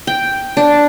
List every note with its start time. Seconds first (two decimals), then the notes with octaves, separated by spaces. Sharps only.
0.07 G5
0.57 D4